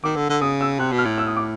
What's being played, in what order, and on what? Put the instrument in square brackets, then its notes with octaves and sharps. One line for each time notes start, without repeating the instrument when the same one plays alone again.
[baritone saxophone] D#3 [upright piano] D6
[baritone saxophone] D3
D3
[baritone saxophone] C#3 [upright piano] D#6
[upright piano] E6
[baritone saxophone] C3 [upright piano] F#6
[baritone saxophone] B2
[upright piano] F6
[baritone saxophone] A2
[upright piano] E6
D#6
D6